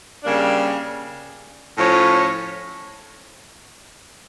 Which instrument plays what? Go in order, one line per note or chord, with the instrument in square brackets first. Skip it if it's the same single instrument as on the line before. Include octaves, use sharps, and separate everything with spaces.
[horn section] C#3 G3 A#3 D4
A2 F3 C#4